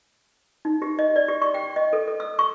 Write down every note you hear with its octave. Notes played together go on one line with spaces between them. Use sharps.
D#4
G4
D#5
D5
G4
C#6
G5
D#5
A4
A4
E6
C#6